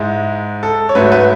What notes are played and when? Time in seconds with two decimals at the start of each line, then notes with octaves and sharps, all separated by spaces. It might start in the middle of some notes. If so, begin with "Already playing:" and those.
Already playing: G#2 G#3 E4
0.63 A4
0.89 C#5
0.95 G#2 F#3 A3 B4
1.12 B4